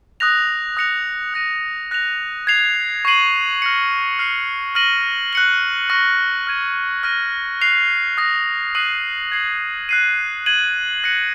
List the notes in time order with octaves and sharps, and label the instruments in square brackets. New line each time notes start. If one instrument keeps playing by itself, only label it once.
[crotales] D#6 F#6 A#6 F7
D#6 F#6 A#6 C#7 F7
F#6 A#6 D#7
F#6 A#6 F7
G#6 C7 F7
C#6 G#6 C7 D#7 F#7
F6 A#6 C#7
F6 C7 F7
F6 A#6 D#7 F#7
F#6 C#7 F#7
C#6 F6 A#6
F6 G#6 D#7
F6 A#6 D#7
F#6 C7 F7
D#6 F#6 A#6
D#6 F#6 C7 D#7 F#7
G#6 C7 F#7
F#6 C7 D#7
G#6 D#7 F#7
F#6 A#6 C#7